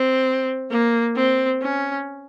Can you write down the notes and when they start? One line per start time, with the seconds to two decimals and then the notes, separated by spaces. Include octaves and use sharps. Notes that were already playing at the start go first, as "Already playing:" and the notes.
Already playing: C4
0.71 A#3
1.16 C4
1.62 C#4